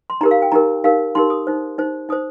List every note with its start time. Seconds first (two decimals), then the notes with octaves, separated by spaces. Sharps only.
0.10 C6
0.21 D#4 G4 A#4 A#5
0.31 F5
0.42 G5
0.52 D#4 G4 A#4 A#5
0.84 D#4 G4 A#4 F5
1.15 D#4 G4 A#4 C6
1.30 D#6
1.47 D#4 C5
1.78 D#4 C5
2.09 D#4 C5 D#6